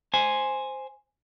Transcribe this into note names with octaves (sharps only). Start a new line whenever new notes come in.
C5 G#5